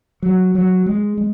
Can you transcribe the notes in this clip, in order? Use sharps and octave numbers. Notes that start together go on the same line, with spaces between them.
F#3
F#3
G#3
G#3